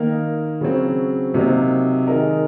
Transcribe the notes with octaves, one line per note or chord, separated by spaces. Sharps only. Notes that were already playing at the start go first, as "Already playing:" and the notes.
Already playing: D#3 A#3 D#4 A#4
C#3 F#3 C4
C3 F#3 A#3 D#4
D#3 G#3 D#4 A#4